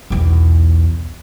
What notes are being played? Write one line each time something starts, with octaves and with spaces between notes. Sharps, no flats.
B1 E2